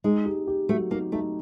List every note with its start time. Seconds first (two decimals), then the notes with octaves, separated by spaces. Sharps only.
0.04 G#3 D#4
0.26 G4
0.47 G4
0.69 F#3 A3
0.91 A#3 D#4
1.12 A3 D#4